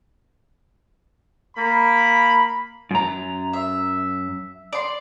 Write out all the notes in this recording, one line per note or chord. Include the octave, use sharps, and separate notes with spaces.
A#3 B5
F#2 A#5
E5
D5 C6